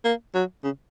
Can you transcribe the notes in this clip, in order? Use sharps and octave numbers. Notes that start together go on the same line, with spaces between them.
A#3
F#3
C#3